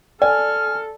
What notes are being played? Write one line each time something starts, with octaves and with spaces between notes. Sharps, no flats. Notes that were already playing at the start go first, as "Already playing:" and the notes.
A4 D5 G#5 F6